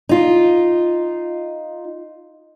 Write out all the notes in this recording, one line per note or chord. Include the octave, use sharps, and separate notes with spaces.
D#4 F4